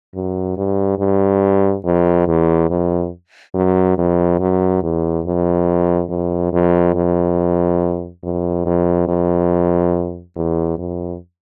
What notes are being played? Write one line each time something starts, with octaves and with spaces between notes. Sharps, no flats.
F#2
G2
G2
F2
E2
F2
F#2
F2
F#2
E2
F2
F2
F2
F2
F2
F2
F2
E2
F2